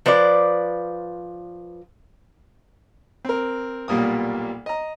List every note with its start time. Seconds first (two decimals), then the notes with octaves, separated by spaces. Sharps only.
0.06 F3 B4 C5 D5
3.25 C4 A#4
3.88 B1 A#2 G3 A#3 D#6
4.66 D#5 A#5